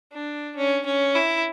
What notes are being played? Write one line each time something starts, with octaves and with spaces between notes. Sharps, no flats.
D4
C#4
C#4
E4